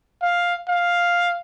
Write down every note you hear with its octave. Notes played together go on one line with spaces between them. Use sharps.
F5
F5